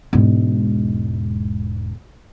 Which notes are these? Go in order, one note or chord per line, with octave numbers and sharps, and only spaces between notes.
E1 G#2